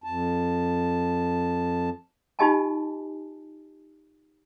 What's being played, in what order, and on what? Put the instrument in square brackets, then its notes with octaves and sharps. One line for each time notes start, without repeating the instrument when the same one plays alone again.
[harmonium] F2 A5
[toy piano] D#4 F4 G4 D#5 G#5 A5